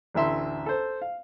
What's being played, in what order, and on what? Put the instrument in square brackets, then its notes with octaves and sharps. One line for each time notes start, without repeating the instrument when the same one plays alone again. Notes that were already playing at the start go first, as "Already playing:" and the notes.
[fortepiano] A1 D2 E5 C6
A4 C5
F5